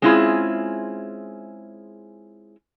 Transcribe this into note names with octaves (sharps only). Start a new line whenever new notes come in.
G#3 C4 C#4 E4 F4 G#4